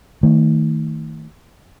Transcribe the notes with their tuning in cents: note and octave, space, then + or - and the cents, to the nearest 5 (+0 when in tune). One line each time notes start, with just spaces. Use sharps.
D#3 +20 A3 +25